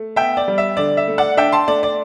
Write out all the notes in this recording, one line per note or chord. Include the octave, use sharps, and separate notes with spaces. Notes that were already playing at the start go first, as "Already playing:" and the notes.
Already playing: A3
B3 E5 G5
D5
G3
E5
D3 D5
E5
A3
D5 F#5
D4 E5 G5
A5 C6
A3 D5
D5